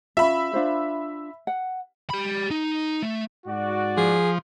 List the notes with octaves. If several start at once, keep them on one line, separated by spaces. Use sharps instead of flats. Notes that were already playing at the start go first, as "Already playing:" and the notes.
C#4 F4 E5 B5
D4 F4 C5
F#5
G4 B5
D#4
A3
G#2 F#4 D5
F3 G#4